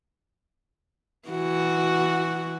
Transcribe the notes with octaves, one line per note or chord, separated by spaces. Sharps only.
E3 F#4